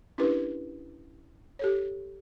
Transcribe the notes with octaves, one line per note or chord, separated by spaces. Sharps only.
C#4 D4 E4 G4 A#4 B4
G4 A4 C#5